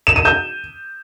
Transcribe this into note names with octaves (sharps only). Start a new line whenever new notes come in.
E7
D#7
G6